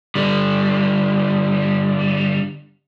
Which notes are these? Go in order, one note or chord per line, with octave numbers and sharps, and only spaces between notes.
D3 G3